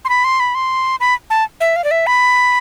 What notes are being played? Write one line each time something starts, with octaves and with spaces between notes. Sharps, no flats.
C6
B5
C6
B5
C6
B5
A5
E5
F5
D5
E5
B5